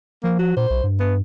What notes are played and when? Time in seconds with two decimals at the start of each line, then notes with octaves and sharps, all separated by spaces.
0.24 F3 A#3
0.39 F#4
0.57 A#2 C5
0.70 B1
0.83 G2
1.00 B3